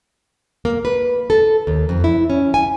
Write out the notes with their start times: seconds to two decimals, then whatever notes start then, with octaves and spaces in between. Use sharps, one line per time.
0.65 A#3
0.85 B4
1.30 A4
1.67 D#2
1.89 F2
2.04 E4
2.30 C#4
2.54 G#5